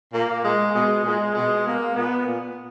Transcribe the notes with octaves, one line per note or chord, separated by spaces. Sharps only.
A#2 A#3
A#2 G#3
B2 G#3
A#2 G#3
B2 G#3
B2 A#3
A#2 B3
A#2